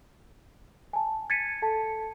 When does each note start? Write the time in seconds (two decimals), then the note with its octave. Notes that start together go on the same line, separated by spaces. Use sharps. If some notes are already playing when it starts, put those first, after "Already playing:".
0.93 G#5 A5
1.30 G#6 A6 B6 C#7 D#7
1.62 A4 A5